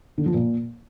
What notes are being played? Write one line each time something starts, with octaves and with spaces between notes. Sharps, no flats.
D3
F3
A#2